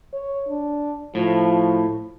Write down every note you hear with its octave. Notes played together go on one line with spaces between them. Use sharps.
C#5
D4
A2 F3